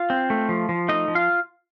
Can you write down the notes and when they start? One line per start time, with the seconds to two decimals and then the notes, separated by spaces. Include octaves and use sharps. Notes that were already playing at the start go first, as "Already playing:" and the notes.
Already playing: F4 F5
0.10 C4
0.30 A3
0.49 F3
0.69 F3
0.88 A3 D#4 D#5
1.08 F3
1.15 F4 F5